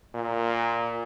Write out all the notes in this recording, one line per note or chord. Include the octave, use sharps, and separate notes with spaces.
A#2